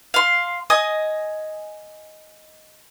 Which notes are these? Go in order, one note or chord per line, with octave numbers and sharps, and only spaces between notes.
F5 C6
D#5 G#5 D#6